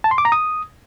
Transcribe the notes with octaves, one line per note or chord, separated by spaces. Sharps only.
A5
C6
D6
A#5
D#6